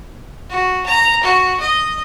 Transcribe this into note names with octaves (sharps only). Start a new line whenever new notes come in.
F#4
A#5
F#4
D#5